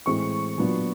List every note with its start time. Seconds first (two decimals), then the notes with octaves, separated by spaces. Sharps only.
0.06 A2 E3 G#3 C4 C#6
0.58 A#2 F#3 B3 D4